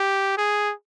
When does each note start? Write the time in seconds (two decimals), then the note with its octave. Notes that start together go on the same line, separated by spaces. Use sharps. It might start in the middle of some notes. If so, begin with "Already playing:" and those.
Already playing: G4
0.37 G#4